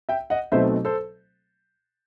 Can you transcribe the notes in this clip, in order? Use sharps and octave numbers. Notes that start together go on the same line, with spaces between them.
E5 G5
D#5 F#5
B2 F#3 A3 C4 D#4 C5 E5
A4 C5